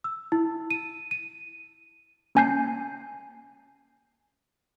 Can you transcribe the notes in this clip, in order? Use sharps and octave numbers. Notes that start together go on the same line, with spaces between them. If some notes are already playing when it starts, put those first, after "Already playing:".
E6
E4
D#7
D#7
A#3 C#4 G#5 A5 G6 C7